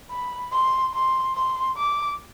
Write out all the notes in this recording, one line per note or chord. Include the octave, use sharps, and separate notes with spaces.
B5
C6
C6
C6
D6